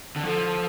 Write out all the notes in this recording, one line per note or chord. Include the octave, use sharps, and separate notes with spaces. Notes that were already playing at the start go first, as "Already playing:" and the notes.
D3
F3 A4